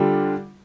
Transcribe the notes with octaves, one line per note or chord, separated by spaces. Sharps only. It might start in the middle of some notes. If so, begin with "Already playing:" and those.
Already playing: D3 G3 D4 F4